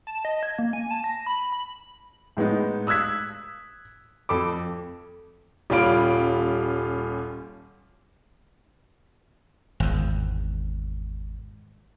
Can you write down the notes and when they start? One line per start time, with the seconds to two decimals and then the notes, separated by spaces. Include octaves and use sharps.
0.07 A5
0.25 D#5
0.43 G#6
0.59 A#3
0.73 G#5
0.91 A5
1.04 A#6
1.26 B5
1.52 B5
2.37 A2 G#3 B3 D#4
2.87 D#6 E6 F#6 G#6 B6
4.29 F2 A4 B5 D6
5.70 D#1 G3 C#4 F4 B5 D7
9.80 G#1 E2